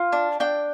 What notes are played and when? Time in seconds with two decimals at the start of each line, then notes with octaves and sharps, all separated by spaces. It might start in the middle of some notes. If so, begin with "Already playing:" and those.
Already playing: F4
0.12 D4
0.40 D4 G5